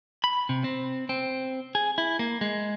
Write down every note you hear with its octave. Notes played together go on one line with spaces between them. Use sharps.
B5
C3
C4
C4
G#4
E4
A#3
G#3